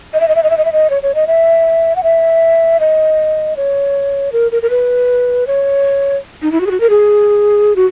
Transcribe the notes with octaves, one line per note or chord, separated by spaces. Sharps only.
D#5
E5
D#5
E5
D#5
E5
D#5
E5
D#5
C#5
C#5
D#5
E5
F#5
E5
D#5
C#5
A#4
A#4
A#4
B4
C#5
D#4
E4
F#4
G#4
F#4
A#4
G#4
F#4